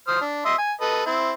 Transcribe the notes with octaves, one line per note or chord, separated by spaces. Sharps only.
C5 D#6 F6
D4
D#5 E5 C6
G#5
A4 B4 D#5
C4 E4